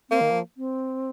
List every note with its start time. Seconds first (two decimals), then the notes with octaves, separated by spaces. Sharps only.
0.10 A#3 C4
0.21 D#3
0.31 F3
0.57 C4